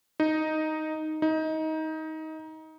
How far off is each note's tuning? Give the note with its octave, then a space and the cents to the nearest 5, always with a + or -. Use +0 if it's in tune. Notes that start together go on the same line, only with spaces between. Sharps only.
D#4 +0
D#4 +20